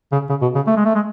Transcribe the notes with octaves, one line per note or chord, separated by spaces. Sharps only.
C#3
C#3
B2
C#3
A3
G#3
A3
G#3